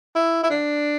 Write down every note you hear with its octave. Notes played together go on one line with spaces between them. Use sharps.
E4
E4
D4